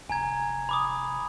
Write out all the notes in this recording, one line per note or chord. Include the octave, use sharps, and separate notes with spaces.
F1 G#5 A#5 G#6
B5 D6 D#6